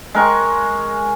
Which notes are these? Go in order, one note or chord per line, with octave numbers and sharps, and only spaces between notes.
G#3 A#4 C#6